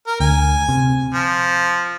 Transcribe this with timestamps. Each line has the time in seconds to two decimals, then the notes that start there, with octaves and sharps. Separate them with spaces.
0.07 A#4
0.20 D2 G#5
0.69 C3
1.14 F3